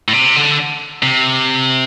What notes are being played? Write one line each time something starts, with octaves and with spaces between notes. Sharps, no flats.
A2
C3
D3
C3